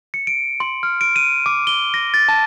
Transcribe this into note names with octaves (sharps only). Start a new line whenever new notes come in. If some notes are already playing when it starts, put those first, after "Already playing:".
C#7
D7
C6
F6
D7
D#7
D6
G7
A#6
A6
A5